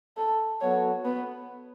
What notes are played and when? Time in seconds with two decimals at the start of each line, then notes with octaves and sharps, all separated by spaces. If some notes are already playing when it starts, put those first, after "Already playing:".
0.17 A4
0.61 F#3 B3 F#4 A4 C#5
1.05 B3